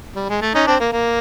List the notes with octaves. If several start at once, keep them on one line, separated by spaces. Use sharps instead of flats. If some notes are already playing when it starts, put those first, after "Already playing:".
G3
G#3
A3
C#4 D#4
C4 D4
A#3
A#3